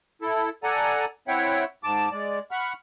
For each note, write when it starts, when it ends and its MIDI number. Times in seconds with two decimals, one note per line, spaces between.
0.22 0.49 64
0.22 0.49 69
0.64 1.05 69
0.64 1.05 74
0.64 1.05 78
0.64 1.05 80
0.64 1.05 82
1.28 1.64 60
1.28 1.64 64
1.28 1.64 73
1.28 1.64 76
1.28 1.64 78
1.28 1.64 79
1.84 2.09 44
1.84 2.09 81
1.84 2.09 86
2.12 2.39 56
2.12 2.39 74
2.51 2.73 78
2.51 2.73 83
2.51 2.73 85
2.51 2.73 89